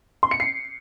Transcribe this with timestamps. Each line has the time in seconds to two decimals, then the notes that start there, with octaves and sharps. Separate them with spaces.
0.23 C6
0.31 C#7
0.40 C7